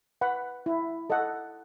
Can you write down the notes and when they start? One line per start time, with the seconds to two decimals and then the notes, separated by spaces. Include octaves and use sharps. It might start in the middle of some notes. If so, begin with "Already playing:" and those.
0.21 B4 F#5 B5
0.66 E4
1.10 A4 D#5 F#5